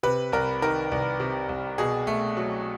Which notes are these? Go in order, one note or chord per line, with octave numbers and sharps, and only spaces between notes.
C3 B4
C2 A#4
D#3 A#4
C2
C3
C2
B2 G#4
A3
F#3